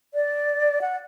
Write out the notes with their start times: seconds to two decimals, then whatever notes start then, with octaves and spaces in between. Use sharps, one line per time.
0.14 D5
0.81 F#5